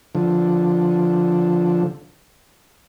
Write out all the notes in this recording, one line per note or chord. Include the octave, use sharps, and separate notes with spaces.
D3 F3